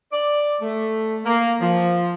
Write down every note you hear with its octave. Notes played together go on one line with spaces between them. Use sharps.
D5
A3
A#3
F3